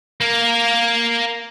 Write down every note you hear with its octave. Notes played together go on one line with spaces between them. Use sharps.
A#3 A#4